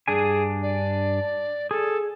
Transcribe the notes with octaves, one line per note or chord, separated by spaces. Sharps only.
G2 D4 G#4 G#5
D5
G#4 A4